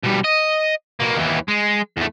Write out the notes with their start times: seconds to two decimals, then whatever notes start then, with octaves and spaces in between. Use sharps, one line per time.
0.03 B2 G3
0.24 D#5
1.00 B2 A#3
1.16 D#2 E3
1.48 G#3
1.97 E2 A3